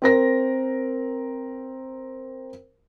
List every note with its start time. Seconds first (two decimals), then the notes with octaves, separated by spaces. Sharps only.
0.02 C4 A#4 A#6